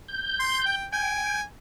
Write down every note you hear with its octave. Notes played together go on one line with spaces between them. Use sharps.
G6
C6
G5
G5 G#5